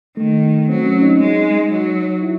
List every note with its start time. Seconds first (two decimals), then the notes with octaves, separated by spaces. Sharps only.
0.17 D#3 A3
0.69 F#3 C4
0.86 C#4
1.02 D#4
1.21 G#3
1.71 F#3
2.23 E4